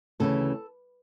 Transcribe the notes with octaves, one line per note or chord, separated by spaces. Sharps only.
D2 C#3 E3 A4